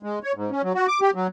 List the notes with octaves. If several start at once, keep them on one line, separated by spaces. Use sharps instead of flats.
G#3
C#5
G#2
C#4
F#3
F#4
D6
G4
F#3